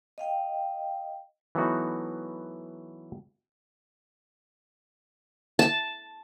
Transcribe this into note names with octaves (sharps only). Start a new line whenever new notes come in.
D#5 F5 G5
E3 F#3 A3 B3 D#4 F#4
A5